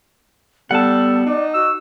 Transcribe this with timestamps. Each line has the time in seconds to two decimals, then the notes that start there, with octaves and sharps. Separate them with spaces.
0.71 G3 B3 A4 F#5 A5
1.26 D#4 D5
1.54 F#4 E6